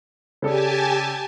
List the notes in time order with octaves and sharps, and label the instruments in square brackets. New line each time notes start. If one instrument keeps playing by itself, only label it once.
[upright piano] C#3 A4 D5 [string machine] G4 G#5 A5